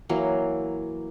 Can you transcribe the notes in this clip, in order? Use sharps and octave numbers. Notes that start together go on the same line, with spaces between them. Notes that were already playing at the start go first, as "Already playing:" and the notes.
E3 F#3 A#3